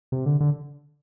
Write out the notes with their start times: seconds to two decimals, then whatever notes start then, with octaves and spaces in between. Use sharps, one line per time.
0.12 C3
0.26 D3
0.41 D3